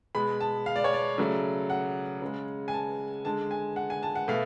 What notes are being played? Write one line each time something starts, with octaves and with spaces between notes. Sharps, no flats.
B2 G#3 B5
A5
F5
D5
C#5
D5
C#3 F#3 A3
F#5
C#3 G#3
G#5
A5
D3 G#3 A5
G#5
F#5
G#5
A5
F#5
B2 A3 F5